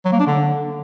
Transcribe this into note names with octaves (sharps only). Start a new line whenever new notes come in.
F#3
A#3
D4
D3